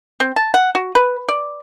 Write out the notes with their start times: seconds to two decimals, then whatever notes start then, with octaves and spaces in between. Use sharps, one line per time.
0.20 C4
0.36 A5
0.54 F#5
0.75 F#4
0.95 B4
1.28 D5